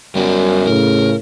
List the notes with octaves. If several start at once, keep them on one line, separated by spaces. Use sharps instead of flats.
F#2 G3 B3 D5
A2 C#3 A#4